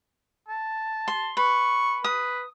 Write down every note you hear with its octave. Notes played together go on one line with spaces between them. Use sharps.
A5
C6
B4 C#6
B4 D#6